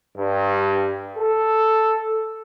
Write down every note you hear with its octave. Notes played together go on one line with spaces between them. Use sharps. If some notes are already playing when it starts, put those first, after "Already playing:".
G2
A4